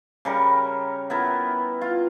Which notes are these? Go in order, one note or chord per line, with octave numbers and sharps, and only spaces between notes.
C#3 G3 A#4
B3 E4 A#4
F4